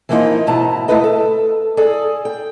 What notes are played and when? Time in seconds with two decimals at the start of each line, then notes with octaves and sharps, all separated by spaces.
0.09 E3 F3 A#3 B3 D#4 F4
0.47 G#2 B2 E4 A5 A#5
0.88 D2 A3 E4 F4 B4 D#5
1.04 A4
1.77 G#4 A4 D5
2.25 G5